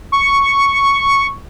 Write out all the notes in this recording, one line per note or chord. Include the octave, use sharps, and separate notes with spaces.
C#6